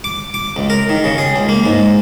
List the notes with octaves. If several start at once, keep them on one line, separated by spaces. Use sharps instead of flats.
D6
D6
C#2
A#4
D#3
C#3
G#4
C#2
A#3
G#2